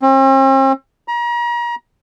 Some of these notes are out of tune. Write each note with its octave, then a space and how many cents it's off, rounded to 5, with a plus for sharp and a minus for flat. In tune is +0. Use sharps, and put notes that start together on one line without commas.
C4 +45
A#5 +35